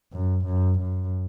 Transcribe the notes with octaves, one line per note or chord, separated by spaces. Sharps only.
F#2
F#2
F#2